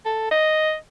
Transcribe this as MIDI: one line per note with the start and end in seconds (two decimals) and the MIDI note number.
0.06 0.28 69
0.31 0.75 75